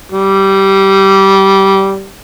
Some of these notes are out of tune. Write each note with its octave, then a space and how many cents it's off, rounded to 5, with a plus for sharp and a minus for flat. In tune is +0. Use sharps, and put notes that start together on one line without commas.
G3 -15